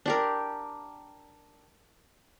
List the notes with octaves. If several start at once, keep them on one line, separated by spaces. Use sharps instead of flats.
D4 G4 A#4